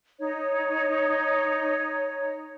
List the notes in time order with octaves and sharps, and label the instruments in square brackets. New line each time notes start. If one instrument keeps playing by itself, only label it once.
[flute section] D#4 C#5